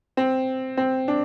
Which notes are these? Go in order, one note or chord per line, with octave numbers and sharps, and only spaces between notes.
C4
C4
D4